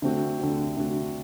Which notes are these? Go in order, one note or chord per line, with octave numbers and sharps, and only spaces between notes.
D3 A3 C4 F#4
D3 A3 C4 F#4
D3 A3 C4 F#4